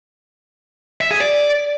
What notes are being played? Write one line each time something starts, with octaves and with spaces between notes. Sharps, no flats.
E5
G#4
D5